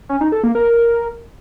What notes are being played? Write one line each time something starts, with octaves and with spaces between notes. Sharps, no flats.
C#4
D#4
A4
A#3
A#4